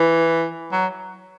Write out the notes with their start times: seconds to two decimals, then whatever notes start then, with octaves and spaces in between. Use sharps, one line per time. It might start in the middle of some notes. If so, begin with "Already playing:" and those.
Already playing: E3
0.72 F#3